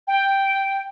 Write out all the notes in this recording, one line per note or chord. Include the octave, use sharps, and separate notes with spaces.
G5